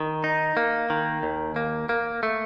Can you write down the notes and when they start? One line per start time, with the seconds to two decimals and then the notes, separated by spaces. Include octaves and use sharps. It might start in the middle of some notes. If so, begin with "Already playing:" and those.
Already playing: D#3
0.24 D#4
0.57 A#3
0.90 D#3
1.23 D#2
1.56 A#3
1.89 A#3
2.23 A3